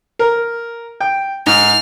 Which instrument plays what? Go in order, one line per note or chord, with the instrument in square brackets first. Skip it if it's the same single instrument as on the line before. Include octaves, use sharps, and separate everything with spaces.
[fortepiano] A#4
G5
[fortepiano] G#2 [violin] F6